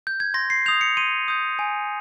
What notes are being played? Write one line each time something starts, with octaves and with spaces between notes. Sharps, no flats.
G6
G#6
C6 A#6
C7
D#6 G6 F7
C#7
C6 D#7
D#6 G6
G#5